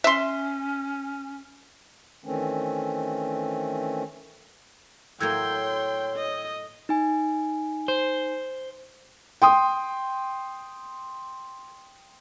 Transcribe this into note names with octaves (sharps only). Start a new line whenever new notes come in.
C#4 E5 C6
D#3 E3 A3 C4 C#4
A2 F#3 A#3 G5 C6 E6 G6 G#6
C#5
D#5
D#4 G#5
C5
G5 C6 D#6